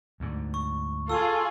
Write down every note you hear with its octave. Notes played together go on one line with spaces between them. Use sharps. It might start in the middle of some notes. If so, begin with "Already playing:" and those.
D2 G#2
C#6
F4 G#4 A4 C#6 E6